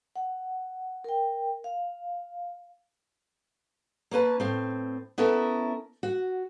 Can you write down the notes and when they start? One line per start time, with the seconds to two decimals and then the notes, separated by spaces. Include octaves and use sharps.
0.16 F#5
1.04 A#4 G5
1.64 F5
4.11 A#3 C#4 B4 A5
4.40 A2 C4
5.18 B3 C#4 E4 A4 A#4
6.03 F#4